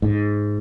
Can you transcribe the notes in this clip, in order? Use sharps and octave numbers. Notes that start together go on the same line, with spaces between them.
G#2